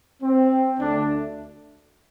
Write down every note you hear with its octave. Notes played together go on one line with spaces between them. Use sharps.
C4
D2 D3 A3 D4